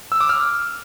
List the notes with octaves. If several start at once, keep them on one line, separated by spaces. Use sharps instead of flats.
E6
D6
F6